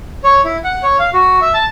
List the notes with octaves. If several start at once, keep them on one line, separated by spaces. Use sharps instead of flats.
C#5
E4
F#5
C#5
F5
F#4
E5
A5